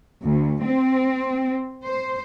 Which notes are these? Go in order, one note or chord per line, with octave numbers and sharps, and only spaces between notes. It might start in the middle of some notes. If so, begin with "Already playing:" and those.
D2
C4
C5